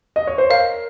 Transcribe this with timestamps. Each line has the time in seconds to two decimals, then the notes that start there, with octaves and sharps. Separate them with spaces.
0.16 D#5
0.27 C#5
0.38 C5
0.50 A#4 F5